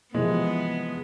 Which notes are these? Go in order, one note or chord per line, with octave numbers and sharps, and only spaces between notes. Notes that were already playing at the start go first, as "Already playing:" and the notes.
C3 E3 F3 G#3 B3